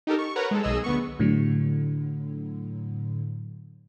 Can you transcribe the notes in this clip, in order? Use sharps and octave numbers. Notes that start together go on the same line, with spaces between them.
D#4 G4 A4 A#4
C#6
A#4 B4 C#5 F#5 A#5
G#3 A4
B1 G#4 D#5 E6
D2 B3 C#6
A2 D3 F#3